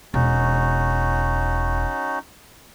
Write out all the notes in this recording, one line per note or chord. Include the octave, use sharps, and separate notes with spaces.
E1 C#4 D#4 F#4